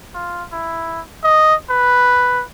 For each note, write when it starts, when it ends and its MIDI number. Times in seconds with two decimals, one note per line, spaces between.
0.15 0.44 65
0.53 1.01 64
1.24 1.55 75
1.70 2.44 71